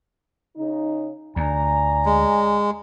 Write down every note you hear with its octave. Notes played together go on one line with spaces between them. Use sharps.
C#3 D#4
D2 D5 G#5 A#5
G#3